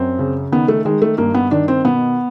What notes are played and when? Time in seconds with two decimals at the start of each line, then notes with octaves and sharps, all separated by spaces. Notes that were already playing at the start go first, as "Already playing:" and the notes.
Already playing: F#2 C4
0.19 C#3
0.52 D#3 B3
0.68 A3
0.85 D#3 G#3
1.02 A3
1.18 G2 A#3
1.34 B3
1.51 D#3 D4
1.68 C4
1.85 B2 B3